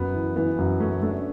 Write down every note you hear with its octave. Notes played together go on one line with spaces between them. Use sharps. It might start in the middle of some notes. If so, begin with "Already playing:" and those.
Already playing: F#2 B3
E3
E3 B3
F#2
A3 C#4
A3 D4